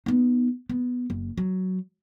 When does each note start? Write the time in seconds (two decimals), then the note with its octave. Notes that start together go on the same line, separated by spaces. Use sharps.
0.06 B3 D#4
0.69 B3
1.10 F#1
1.37 F#3